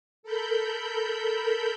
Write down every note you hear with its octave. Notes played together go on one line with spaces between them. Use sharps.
A4 A#4 B5 G6